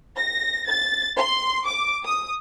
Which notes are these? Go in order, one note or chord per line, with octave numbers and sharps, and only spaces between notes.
A#6
A6
C6
D6
D#6